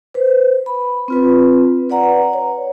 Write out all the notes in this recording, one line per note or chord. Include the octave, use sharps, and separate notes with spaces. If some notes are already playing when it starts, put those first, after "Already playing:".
B4 C5
B5
C4 F4 B4
B4 D5 F#5 A#5
C#5